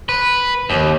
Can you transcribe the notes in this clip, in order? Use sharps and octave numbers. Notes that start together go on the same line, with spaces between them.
B4
D#2